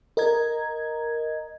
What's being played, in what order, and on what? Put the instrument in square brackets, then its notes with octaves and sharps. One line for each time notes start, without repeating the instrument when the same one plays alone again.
[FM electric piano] A#4 D#5 A#5 G#6